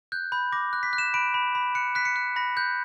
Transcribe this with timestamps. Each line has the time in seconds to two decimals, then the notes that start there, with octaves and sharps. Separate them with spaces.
0.12 F#6 G6
0.32 B5 G6
0.52 D6 A#6
0.73 F#6
0.83 B6
0.93 F#6
0.98 E7
1.14 B5 D7
1.34 B5
1.55 B5
1.75 F#6 C#7
1.95 F#6 B6
2.05 C#7
2.16 F#6
2.36 B5 A#6
2.57 F#6 G6